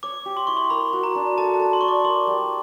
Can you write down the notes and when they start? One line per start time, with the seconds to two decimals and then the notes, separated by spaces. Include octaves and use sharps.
0.03 C#5 D6
0.26 G4
0.37 C6
0.47 E4 C#6
0.57 C6
0.70 A#4 B5
0.93 F#4
1.03 A#5
1.15 D4
1.38 A4 A5
1.54 A5
1.59 A4
1.73 C6
1.81 D5 C#6
1.88 D6
2.04 A#4 C6
2.27 G3